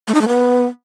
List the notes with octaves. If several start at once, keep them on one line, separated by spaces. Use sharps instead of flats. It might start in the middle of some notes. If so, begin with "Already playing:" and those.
A3
D#4
A3
B3